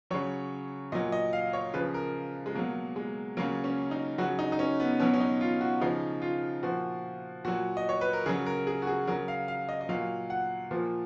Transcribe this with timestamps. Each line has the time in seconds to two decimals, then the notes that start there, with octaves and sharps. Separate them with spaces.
0.11 C#3 F#3 C#5
0.92 A#2 F#3 D#5
1.12 D#5
1.33 F5
1.53 C#5
1.74 C#3 F3 B4
1.94 A#4
2.46 G#3
2.55 B2 F#3 A#3
2.96 G#3
3.37 C#3 F#3 A#3
3.64 C#4
3.91 D#4
4.18 C#3 F#3 F#4
4.39 D#4
4.52 D#4
4.59 C#4
4.80 B3
5.00 B2 F#3 C#4
5.14 C#4
5.20 D#4
5.41 F4
5.61 F#4
5.81 C#3 F3 D#4
6.22 F4
6.63 A#2 F3 F#4
7.45 A#2 F#3 F#4
7.77 D#5
7.89 C#5
8.01 B4
8.13 A#4
8.26 C#3 F#3 G#4
8.46 A#4
8.67 G#4
8.82 F#4
8.87 G#4
9.07 C#3 F#3 A#4
9.28 F5
9.48 F5
9.69 D#5
9.81 D#5
9.89 A#2 F#3 F5
10.30 F#5
10.71 A#2 F3